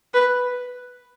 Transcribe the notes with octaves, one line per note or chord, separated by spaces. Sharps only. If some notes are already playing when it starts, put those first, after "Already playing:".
B4